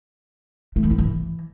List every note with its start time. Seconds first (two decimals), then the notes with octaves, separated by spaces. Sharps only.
0.76 A3
0.83 E3
0.91 F4
0.98 E3